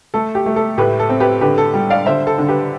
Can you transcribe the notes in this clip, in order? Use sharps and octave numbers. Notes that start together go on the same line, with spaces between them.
A3 A4
G4
A3
A4
A2 G4 B4
A4
C4
G4 B4
D3 G4 B4
A4
G3
D5 F5
D3 C5 E5
A4
D3
G4 B4